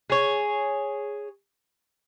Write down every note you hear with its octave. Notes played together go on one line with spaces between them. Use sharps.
G#4 C#5